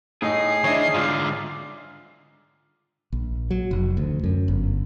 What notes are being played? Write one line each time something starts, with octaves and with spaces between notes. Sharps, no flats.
A2 D#4 G#4 C7
D#3 D4 E4 C#5 D#5
G#2 D3 F4
A#1
F#3
F1
D2
F#2
G1